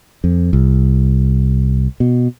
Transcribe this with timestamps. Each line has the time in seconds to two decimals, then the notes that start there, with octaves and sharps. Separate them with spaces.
0.24 F2
0.53 C2
2.00 B2